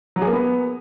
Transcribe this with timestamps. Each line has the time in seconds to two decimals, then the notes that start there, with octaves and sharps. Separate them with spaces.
0.16 F#3
0.22 G#4
0.27 A#3
0.33 B3